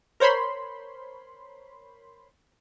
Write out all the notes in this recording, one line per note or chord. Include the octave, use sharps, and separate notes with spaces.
A#4 C5 C#5 B5 C6